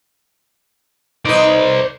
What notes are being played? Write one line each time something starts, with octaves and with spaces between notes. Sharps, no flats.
D#4 B4 C5 D5